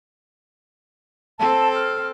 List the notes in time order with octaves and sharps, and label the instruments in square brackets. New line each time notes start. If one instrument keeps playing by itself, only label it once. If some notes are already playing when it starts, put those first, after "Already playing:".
[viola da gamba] C4 A4 [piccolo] A5
[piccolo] F6